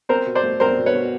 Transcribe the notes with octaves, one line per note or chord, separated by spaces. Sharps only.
C4 A#4 C5
B2
C5 D5
A3
C4 A#4 C5
B2
B4 C#5
B2